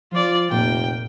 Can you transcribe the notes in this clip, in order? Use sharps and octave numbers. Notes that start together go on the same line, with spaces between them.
F3 F4 D5
F1 A#2 G5